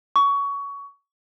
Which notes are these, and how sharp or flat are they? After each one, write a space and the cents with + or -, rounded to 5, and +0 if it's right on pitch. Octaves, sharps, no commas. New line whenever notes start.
C#6 +20